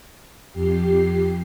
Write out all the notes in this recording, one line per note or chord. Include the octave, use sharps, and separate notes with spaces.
F2 G4 C7